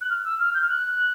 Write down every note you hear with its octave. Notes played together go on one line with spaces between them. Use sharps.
F#6
F6
E6
F6
G6
F6
F#6